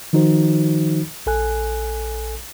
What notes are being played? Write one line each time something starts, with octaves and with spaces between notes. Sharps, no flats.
D#3 F3 D#4 F#4 C5
A#1 A4 G#5 F#6